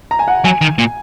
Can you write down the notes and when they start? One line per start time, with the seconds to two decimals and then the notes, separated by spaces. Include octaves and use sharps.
0.11 A#5
0.19 G#5
0.28 F#5
0.44 F#3 G#5
0.61 D#3
0.78 A#2